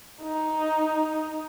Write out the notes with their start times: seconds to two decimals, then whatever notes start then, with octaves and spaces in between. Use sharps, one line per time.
0.23 D#4